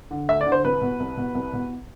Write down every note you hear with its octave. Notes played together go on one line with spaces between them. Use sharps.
D3
D2 E5
D5
D3
C5
C2 B4
B2
C2
B2
C2
B2